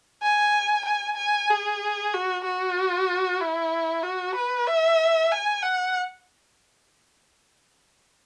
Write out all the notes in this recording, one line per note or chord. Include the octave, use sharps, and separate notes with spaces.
G#5
G#5
G#5
G#4
F#4
F#4
E4
F#4
B4
E5
G#5
F#5